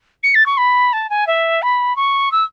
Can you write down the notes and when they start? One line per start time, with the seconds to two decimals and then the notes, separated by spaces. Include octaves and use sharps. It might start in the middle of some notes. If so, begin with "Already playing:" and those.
0.23 C#7
0.34 A6
0.46 C#6
0.57 B5
0.93 A5
1.09 G#5
1.27 E5
1.62 B5
1.96 C#6
2.31 E6